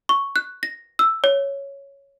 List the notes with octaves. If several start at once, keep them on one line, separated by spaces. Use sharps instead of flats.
C#6
F#6
A#6
E6
C#5